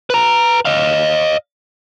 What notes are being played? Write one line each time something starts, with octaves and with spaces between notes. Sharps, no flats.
B4 A#5
D#5 F5